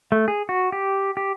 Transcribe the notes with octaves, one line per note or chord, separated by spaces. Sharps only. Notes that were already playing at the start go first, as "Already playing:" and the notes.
A3
G#4
F#4
G4
G4